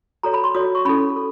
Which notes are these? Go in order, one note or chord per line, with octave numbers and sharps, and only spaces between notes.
F#4 A4 C#5 A#5
B5
C6
F#4 A4 C#5 D#6
C#6
C#4 E4 A4 B5
A4